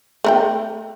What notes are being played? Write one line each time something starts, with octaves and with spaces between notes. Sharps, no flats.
A3 A#4 G5